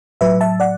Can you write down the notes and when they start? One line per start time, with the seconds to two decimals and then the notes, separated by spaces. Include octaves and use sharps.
0.21 A2 F#3 B4 E5
0.41 E5 A5
0.60 D5 F#5